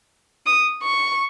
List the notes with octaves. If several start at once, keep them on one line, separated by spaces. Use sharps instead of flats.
D#6
C#6